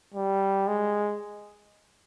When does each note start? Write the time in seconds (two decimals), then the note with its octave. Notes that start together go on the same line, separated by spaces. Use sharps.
0.14 G3
0.68 G#3